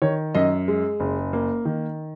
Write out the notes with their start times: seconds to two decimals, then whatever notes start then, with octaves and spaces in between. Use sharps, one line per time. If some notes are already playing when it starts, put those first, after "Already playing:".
0.02 D#3 C#5
0.35 F#2 D#5
0.68 G#3
1.00 F#1
1.33 A#3
1.65 D#3